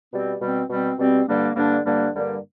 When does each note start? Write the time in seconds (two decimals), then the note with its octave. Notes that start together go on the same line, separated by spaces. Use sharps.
0.12 B2 G3 C4
0.41 B2 G3 C4
0.69 B2 G3 C4
0.99 B2 G3 C4
1.27 G2 D3 G3 A#3 D4
1.56 G2 D3 G3 A#3 D4
1.85 G2 D3 G3 A#3 D4
2.14 G2 D3 G3 A#3 D4